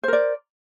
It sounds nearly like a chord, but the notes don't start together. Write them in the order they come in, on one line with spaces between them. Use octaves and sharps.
C5 A#4 D5